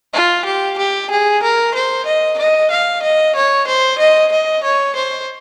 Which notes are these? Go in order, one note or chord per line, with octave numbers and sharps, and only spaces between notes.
F4
G4
G4
G#4
A#4
C5
D#5
D#5
F5
D#5
C#5
C5
D#5
D#5
C#5
C5